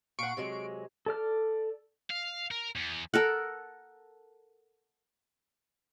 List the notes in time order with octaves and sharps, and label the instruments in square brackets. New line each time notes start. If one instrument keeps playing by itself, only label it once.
[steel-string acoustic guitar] A#2 F#5 [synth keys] C#6 C7 D7
[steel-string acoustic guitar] C3 F#3 G#3
[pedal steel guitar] A4 D5 F6
[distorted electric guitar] F5
A#4
E2
[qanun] A4 A#4 F#5